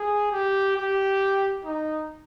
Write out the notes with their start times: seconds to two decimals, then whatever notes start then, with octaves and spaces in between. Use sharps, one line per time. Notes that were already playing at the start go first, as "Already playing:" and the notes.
Already playing: G#4
0.32 G4
0.77 G4
1.65 D#4